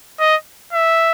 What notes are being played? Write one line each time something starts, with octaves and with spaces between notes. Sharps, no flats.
D#5
E5